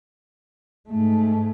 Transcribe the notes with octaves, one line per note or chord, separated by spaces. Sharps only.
G#2 A3